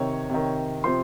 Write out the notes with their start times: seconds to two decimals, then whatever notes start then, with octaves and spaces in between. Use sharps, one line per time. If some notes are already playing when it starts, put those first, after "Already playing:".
Already playing: C3 D#3 C#5
0.30 C3 D#3
0.84 C3 F3 C5 C6